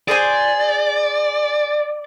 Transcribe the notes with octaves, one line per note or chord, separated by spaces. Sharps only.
G#4 C5 D5 G#5